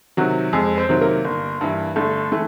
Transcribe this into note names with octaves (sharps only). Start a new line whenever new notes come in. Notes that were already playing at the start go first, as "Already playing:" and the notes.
C3 D#3 F#3 F#4
F2 G#3 G#4
C4 C5
C3 D#3 F#3
A#3 A#4
G1
G2 E3
G1 A3 A4
E3 A3